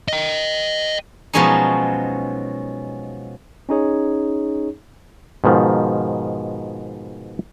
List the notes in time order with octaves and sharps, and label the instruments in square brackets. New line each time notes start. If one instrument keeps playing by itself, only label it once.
[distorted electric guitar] D#5 G5
[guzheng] B2 F3 F#3 G#3 C#4 D#4
[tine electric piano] C#4 D#4 G#4 C#5
[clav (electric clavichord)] G#2 B2 D#3 F3